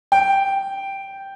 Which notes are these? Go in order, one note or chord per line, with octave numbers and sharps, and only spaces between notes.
G5